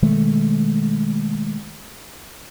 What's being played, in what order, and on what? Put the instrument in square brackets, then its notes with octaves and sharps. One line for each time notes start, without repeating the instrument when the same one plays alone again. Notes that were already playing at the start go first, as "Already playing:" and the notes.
[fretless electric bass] B2 D#3 G#3 A3